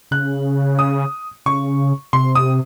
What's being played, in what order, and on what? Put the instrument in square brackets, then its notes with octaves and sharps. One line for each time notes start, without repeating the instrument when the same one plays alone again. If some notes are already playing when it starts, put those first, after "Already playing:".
[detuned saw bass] C#3 [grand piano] F#6
[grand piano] D#6
[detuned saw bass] C#3 [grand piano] C#6
[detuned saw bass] C3 [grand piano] C6
[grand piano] D#6